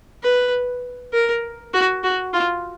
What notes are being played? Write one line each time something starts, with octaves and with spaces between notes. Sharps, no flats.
B4
A#4
F#4
F#4
F4